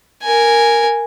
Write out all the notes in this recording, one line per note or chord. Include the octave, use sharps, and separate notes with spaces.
A#4 G#5